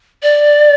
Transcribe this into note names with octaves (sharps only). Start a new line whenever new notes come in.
D5